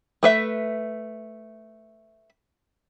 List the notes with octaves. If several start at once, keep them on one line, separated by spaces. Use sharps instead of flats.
A3 B4 E5